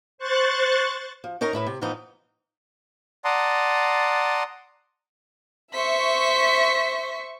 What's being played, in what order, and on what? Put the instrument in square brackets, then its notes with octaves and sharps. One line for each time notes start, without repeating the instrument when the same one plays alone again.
[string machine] C5 C#6 F#6 A6
[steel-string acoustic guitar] F3
C#4 D#4 A#4 C#5 A#5
A2 E4 B4
C3
A2 E3 F3 B3 D#4
[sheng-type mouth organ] D5 F#5 A5 A#5 C6 D#6
[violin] C5 B6 [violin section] E5 C#6